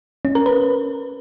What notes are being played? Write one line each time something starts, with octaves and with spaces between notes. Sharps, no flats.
C#4
A#4
B4